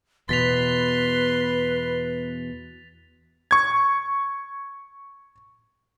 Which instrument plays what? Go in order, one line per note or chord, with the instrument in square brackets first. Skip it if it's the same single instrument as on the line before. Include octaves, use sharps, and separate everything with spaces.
[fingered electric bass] E2 B2 [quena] B4 [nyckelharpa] C6 [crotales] A6 B6 F7
[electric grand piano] C#6 G#6